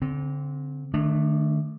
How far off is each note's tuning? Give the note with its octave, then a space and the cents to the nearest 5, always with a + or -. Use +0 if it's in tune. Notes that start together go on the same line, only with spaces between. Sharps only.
D3 -35 C4 +0
D#3 -35 A3 +0 D4 +0